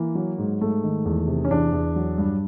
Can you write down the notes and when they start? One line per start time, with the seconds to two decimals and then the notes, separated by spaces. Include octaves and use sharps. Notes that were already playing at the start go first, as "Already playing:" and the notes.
Already playing: E3 A#3
0.15 F#3
0.38 G#2
0.61 G#2 A3
0.83 D#3
1.05 E2
1.28 C3
1.45 C#4
1.51 E2 D4
1.73 E2
1.96 F#3
2.18 G2